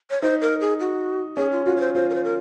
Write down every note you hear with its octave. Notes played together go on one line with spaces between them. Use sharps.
C#5
D#4 C5
A#4
G#4
F#4
C#4 G#4
F4
F4 F#4
C#5
C5
F4 C5
A#4
C5
A#4